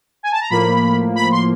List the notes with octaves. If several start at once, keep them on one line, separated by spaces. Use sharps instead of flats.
G#5
A5
A#5
A2 F3 A#3 B5
B5
C6